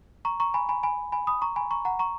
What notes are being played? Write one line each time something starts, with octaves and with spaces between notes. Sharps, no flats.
A#5 C#6
A#5 C#6
G#5 B5
G#5 B5
G#5 B5
G#5 B5
B5 D#6
A#5 C#6
G#5 B5
A#5 C#6
F#5 A#5
A#5 C#6